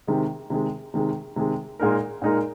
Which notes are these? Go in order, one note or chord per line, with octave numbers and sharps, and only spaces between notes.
C3 D#3 G#3
C3 D#3 G#3
C3 D#3 G#3
C3 D#3 G#3
A#2 G#3 D#4 A#4
A#2 G#3 D#4 A#4